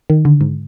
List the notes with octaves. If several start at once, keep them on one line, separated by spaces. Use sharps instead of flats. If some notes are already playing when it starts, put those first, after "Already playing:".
D#3
D3
G#2